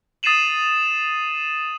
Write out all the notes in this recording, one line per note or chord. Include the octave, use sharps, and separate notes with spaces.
D#6 A6 C7 D#7 E7 F#7